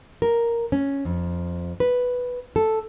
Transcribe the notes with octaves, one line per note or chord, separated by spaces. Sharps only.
A#4
C#4
F2
B4
A4